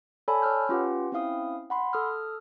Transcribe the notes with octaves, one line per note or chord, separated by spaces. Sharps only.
A4 C#5 D5 G#5 A5 B5
C#5 B5 E6 F6 G6
C#4 F4 G4 B4 F#5
C4 C#4 E4 F5 D#6
F#5 B5 C6
A4 D#6 F6